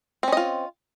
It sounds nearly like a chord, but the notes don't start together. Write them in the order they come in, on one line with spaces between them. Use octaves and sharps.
C4 C#4 D#5 F4